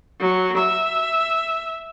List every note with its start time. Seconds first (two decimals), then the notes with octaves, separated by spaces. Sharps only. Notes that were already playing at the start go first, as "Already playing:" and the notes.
0.19 F#3
0.57 E5